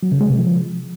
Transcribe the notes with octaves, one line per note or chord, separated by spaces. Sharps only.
F#3
C#3
G#3
C3
F3